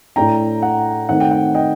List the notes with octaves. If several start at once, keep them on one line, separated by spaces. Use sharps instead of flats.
A2 A3 D4 G5 A#5
F#5
D#3 A3 C4 D#4 F#5
G5
F#5
D#5 G5